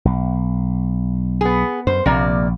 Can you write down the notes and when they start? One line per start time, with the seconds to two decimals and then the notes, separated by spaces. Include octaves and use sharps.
0.05 B1
1.41 B3 G#4
1.87 F#2 C5
2.06 A#1 C3 A#3 D5